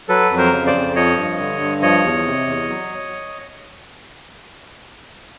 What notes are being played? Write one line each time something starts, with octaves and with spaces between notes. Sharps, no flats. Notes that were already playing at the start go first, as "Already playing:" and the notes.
F#3 A4 B4
F2
A#4 C5
C#3
C5 D5
F2
F3 C#5 D#5
G2
D3
G2
F3 C#5 D#5
E2
C3
E2
F#3